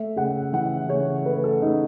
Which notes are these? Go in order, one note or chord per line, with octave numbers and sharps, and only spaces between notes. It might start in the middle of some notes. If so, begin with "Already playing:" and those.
Already playing: A3 E5
C#3 F#5
E3 F#5
C#3 C#5
A3 B4
A4
C#3 D#4